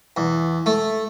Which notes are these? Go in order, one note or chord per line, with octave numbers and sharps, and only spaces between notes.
E2
A3